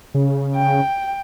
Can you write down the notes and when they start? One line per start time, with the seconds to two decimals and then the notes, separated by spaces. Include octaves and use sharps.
0.14 C#3
0.56 G5